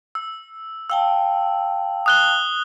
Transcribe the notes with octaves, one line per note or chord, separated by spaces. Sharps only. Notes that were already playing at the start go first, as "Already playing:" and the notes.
E6
F5 G5 A5 E6
D#6 F#6 G7